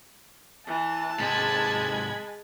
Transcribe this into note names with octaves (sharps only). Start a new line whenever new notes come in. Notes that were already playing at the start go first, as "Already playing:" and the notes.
E3 A5
G#2 C3 G#3 B5 G#6